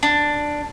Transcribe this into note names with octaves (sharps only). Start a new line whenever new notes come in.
D4